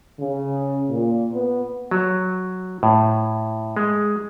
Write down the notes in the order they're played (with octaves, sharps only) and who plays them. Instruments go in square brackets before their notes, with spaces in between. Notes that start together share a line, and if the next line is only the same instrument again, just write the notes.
[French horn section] C#3
A#2
B3
[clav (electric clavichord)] F#3
A2
G#3